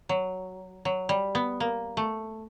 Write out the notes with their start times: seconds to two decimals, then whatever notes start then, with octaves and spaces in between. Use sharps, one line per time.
0.09 F#3
0.85 F#3
1.09 G3
1.35 B3
1.60 A#3
1.97 A3